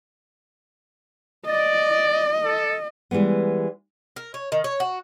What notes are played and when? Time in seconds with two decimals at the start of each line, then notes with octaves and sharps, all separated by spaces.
1.46 D5 D#5
2.43 A4
3.11 E3 G3 G#3 B3
4.16 A#4
4.34 C#5
4.52 D#3
4.64 C#5
4.80 F#4